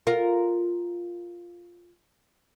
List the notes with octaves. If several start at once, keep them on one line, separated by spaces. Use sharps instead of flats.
F4 A#4